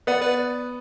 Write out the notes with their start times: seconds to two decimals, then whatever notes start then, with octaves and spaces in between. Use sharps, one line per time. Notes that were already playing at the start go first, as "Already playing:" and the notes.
0.07 B3 D5 F#5
0.21 B4 D5